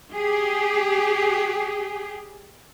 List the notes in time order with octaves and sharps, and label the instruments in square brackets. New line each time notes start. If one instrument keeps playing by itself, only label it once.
[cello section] G4 G#4